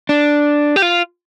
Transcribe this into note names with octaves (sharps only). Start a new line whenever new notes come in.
D4
G4
F4